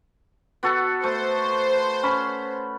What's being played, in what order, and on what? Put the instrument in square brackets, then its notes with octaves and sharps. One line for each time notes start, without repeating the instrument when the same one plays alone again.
[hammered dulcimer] B3 F#4 A4
[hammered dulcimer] A3 [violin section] C5
[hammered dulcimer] C#4 B5